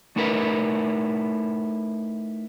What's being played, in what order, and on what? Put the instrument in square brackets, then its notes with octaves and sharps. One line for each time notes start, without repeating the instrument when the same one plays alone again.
[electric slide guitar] A3 D#4 E4 A#4 B4